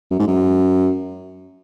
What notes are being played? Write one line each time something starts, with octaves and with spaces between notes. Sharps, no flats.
F#2
G#2
F#2